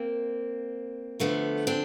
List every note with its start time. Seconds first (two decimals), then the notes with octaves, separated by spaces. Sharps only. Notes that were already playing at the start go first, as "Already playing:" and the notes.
Already playing: A#3 C4
1.19 D2 D3 F3 A3 B3
1.67 C4 D4